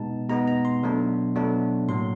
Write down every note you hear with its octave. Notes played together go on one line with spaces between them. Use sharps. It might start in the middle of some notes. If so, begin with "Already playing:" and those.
Already playing: B2 G#3 B3 D#4 A5
B2 G#3 B3 D#4 A#5
A#5
C6
B2 F#3 A3 D4
B2 F#3 A3 D4
A2 F#3 A#3 C6